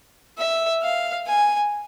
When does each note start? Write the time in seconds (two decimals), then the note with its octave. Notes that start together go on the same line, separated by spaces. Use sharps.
0.38 E5
0.83 F5
1.27 G#5